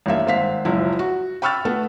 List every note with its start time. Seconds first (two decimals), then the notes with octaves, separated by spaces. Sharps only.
0.06 A1 G2 A#3 E5
0.26 G#1 C4 F5 B6
0.65 F#1 C#2 F3 E4
0.99 F#4
1.42 G5 B5 C#6 E6 F6 A6
1.65 A3 B3 A4